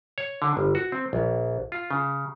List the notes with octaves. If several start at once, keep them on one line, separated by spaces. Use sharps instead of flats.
C#5
D3
G1
F#4
C4
A#1
F4
C#3